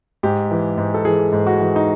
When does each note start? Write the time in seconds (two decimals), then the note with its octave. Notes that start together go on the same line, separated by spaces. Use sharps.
0.23 G#2 G4
0.51 E3
0.77 G#2
0.94 A4
1.05 E3 G#4
1.32 G#2
1.47 F#4
1.61 E3
1.76 D#4